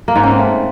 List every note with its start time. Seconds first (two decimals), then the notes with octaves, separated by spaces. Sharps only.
0.08 A#3
0.16 G#2
0.23 C#4
0.31 C4
0.39 A3